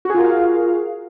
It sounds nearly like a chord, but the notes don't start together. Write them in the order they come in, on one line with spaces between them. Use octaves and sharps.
F#4 G#4 F4 A#4 F5